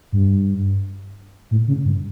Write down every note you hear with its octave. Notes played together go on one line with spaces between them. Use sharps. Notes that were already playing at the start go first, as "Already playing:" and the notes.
G2
A2
C#3
G2